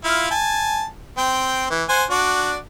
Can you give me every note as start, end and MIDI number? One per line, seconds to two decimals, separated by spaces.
0.04 0.29 64
0.04 0.29 65
0.04 0.29 77
0.31 0.85 80
0.31 0.85 81
1.18 1.66 60
1.18 1.66 79
1.70 1.84 52
1.89 2.04 72
1.89 2.04 78
1.89 2.04 80
2.10 2.57 62
2.10 2.57 66
2.10 2.57 74